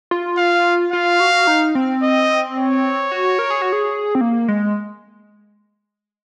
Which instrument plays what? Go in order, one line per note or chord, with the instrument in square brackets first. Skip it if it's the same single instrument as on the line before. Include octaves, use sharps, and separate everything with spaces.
[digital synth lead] F4
[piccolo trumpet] F5
[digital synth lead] F4 [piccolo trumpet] F5
[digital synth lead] F#4
D#4
C4
[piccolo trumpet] D#5
C#5
[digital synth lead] F#4
A#4
G#4
F#4
G#4
C4
A#3
G#3